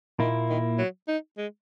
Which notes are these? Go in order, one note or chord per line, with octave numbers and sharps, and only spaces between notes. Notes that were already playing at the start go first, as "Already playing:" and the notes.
A#2 D#3 A#3 E4
D#3
F#3
D#4
G#3